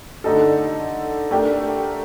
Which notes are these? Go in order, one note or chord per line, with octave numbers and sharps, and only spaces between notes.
D3 A3 D#4 A4
A3 D4 G4 A#4